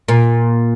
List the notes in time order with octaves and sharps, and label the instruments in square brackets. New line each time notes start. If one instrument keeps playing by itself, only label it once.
[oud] A#2